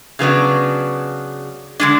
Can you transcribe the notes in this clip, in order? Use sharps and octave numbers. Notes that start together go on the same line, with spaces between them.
C#3 F#3 B3 D4
D3 G#3 D4